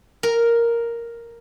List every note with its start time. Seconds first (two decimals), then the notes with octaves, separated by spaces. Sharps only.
0.23 A#4